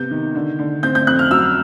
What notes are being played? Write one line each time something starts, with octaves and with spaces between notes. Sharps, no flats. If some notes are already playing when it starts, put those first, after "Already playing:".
Already playing: C3 B3 G6
D#3
D3
D3
C4 G6
G6
F2 F#6
F6
F#3 E6